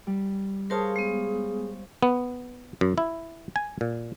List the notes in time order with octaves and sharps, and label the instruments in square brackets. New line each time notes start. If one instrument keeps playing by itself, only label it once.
[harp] G3
[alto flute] G#4 [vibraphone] A#4 A5 D#6 [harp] C5 C#5 F5
[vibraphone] G#3 B3
[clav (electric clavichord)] B3
F#2
E4
G#5
A#2